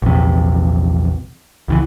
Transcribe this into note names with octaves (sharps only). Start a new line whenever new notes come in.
A#1 E2 C3
C#2 D#3 E3